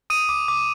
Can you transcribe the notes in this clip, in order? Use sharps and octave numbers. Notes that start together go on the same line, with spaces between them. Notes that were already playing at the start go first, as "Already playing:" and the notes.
D#6 D#7
D6
D6